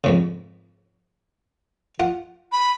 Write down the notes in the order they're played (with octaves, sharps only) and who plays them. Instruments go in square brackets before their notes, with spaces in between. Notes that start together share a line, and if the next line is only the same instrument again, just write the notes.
[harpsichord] F2 G#2 C#3
F4 F#5
[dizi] B5